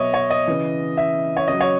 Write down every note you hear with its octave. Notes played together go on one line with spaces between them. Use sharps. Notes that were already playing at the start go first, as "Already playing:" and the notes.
Already playing: B2 F#3 C#5 D#5 E5
C#5
D#5
C#3 E3
E5
C#5
C#3 F#3 D#5
C#5